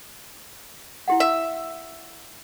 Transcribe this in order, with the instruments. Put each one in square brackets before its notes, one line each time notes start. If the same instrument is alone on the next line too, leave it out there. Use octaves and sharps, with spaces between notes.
[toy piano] E4 G4 F#5
[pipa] E5